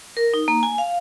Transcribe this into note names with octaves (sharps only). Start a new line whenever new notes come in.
A#4
D#4
A#3
G#5
F5